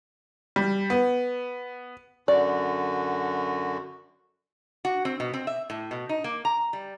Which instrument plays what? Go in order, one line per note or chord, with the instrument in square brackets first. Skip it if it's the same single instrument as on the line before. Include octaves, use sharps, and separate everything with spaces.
[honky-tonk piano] G3
B3
[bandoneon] F#2 D3 F#4 [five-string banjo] D5
[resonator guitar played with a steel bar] F#4
C4
B2
C4
E5
A2
B2
D#4
A#3
A#5
G3